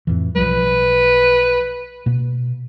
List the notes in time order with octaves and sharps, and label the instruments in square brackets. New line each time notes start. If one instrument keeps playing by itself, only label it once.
[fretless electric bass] F2 A2 E3
[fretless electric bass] B1 F3 G3 [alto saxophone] B4
[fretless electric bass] B2 A#3